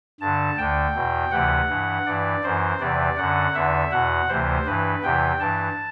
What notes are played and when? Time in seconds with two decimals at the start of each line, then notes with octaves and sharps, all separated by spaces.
0.20 G2 D3 A5
0.58 D2 D3 G5
0.95 E2 B2
1.31 D2 C3 E3 F#5
1.69 G2 E3
2.06 G2 E3 D5
2.43 F#2 E3 C5
2.80 E2 C3 E3 D5
3.17 F#2 D3 F#5
3.54 E2 D3 E5
3.91 E2 B2 F#5
4.28 D2 C3 E3 C5
4.66 G2 E3 B4
5.02 E2 C3 E3 G5
5.39 G2 E3 A5